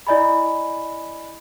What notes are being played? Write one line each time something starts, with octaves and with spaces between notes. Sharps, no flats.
E4 D5 D#5 G#5 B5